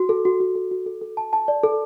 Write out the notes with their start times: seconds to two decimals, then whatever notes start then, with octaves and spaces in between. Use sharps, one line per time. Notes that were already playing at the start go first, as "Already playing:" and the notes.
Already playing: F#4
0.09 A4
0.25 F#4
0.40 F#4
0.55 A4
0.71 F#4
0.86 A4
1.01 A4
1.17 A5
1.33 A5
1.48 D5
1.63 A4